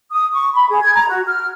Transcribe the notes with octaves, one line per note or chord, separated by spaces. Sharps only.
D#6
C#6
B5
G#4
G#6
A#5
F#4
F6